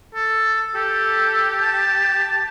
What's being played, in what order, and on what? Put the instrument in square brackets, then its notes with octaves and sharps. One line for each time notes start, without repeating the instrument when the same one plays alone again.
[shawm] A4
[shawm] G4 [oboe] A4
[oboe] A5